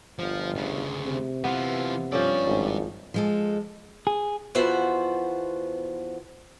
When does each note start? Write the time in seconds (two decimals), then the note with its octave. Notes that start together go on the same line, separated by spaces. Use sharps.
0.19 G1 F3
0.55 D2 C#3
1.04 C3
1.44 E3 B3 F4
2.12 G2 F3 C#4 A4 D5
2.46 G#1
3.14 F3 G#3 A4
4.07 G#4
4.55 E2 F3 B3 F#4 C5 E5